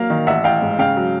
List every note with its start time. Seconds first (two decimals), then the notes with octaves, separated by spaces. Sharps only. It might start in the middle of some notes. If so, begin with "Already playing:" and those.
Already playing: F#3 A#3 F5
0.10 D#3
0.27 A1 E5 F#5
0.44 A1 F5 G5
0.62 G#2
0.78 C#3 F5 G5
0.97 F#3